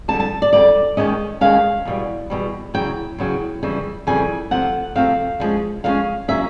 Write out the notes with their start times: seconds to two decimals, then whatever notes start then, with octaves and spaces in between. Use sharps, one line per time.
0.08 F2 D3 G3 A5
0.20 A5
0.42 D5
0.53 F2 D3 G3 D5
0.97 D#2 D#3 G#3 C#4 D#5
1.41 D#2 D#3 G#3 C#4 F5
1.85 E2 B2 G3
2.30 E2 B2 G3
2.74 E2 C#3 F#3 G5
3.18 E2 C#3 F#3
3.63 F2 C#3 E3 G3
4.07 F2 C#3 E3 G3 G#5
4.51 C3 F3 A3 C4 F#5
4.95 C3 F3 A3 C4 F5
5.40 D3 F3 G#3 C#4
5.84 D3 F3 G#3 C#4 F5
6.28 D3 F#3 A#3 C#4 E5